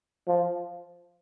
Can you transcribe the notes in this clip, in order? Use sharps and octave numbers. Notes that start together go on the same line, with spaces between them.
F3